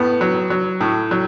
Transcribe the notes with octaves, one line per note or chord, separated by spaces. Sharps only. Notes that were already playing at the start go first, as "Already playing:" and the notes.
Already playing: A2 B3
F#3
F#3
A2
F#3